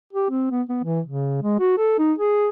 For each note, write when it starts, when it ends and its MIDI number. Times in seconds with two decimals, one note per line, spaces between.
0.13 0.30 67
0.30 0.46 60
0.51 0.62 59
0.69 0.79 59
0.84 1.00 52
1.06 1.41 49
1.42 1.58 56
1.60 1.75 66
1.78 1.98 69
1.99 2.13 63
2.19 2.49 68